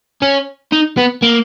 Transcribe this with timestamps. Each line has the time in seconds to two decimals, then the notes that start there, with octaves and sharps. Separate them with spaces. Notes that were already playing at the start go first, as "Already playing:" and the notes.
0.22 C#4
0.73 D#4
0.98 B3
1.23 A#3